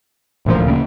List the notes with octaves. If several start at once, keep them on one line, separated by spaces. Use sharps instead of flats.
D1 A1 D2 A#2 F3
C#3 A#3